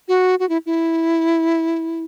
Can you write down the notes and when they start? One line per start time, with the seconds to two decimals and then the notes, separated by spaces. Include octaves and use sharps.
0.08 F#4
0.40 F#4
0.49 E4
0.66 E4